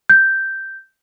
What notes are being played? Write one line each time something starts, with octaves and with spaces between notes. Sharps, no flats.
G6